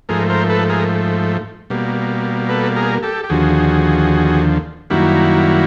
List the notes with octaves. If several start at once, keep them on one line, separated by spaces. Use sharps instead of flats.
G#2 F3 A3 G#4 A#4
A#4 C5
A4 B4
G#4 A#4
B2 G3 A#3
A4 B4
G#4 A#4
G4 A4
G4
D#2 D3 F3 F#4 G#4
F#2 D#3 G3 A#3 E4 F#4